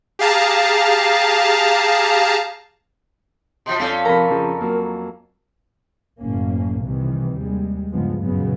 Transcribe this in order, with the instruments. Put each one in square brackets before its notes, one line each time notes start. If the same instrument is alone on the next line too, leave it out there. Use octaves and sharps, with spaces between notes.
[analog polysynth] G4 G#4 F5 A5 A#5
[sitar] B2 F3 [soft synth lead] C6
[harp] F2 F4 G6 [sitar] C#4 A4 D5
[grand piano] F2 C3 F3 [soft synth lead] A#4 [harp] A#5 B5
[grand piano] C#3 F3
F#3 A#3
[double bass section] F#1 A2 A#3 C#4
C2 C3 D#3 E3
D#2 G3 G#3
C2 G2 C#3 F3 G#3 B3
F#2 A#2 C#3 F#3 G#3 B3